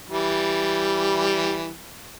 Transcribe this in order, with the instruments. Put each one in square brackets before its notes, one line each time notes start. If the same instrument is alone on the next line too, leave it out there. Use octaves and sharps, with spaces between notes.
[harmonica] E3 G3